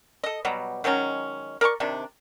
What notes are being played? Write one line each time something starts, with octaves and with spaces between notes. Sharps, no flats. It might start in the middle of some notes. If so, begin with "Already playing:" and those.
A4 D#5
B2 F#3 G3
D#3 F#3 G#3 C#4
A#4 D5 A#5 C#6
C3 D#3 D4